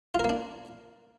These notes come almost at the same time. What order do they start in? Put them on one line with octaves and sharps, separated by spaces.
F4 A#4 A#3 D4